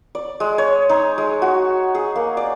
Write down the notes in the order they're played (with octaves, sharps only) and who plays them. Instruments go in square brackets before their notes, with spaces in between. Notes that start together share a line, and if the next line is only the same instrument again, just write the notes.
[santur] D5
G#3
C#5
D#4
G#3
F#4
G#4
A#3
D5